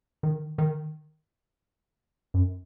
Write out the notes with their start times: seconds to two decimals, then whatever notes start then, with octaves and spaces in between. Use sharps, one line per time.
0.23 D#3
0.58 D#3
2.34 F#2